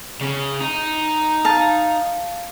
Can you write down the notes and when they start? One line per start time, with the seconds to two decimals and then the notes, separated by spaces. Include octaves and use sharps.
0.21 C#3
0.61 D#4
1.45 F5 A5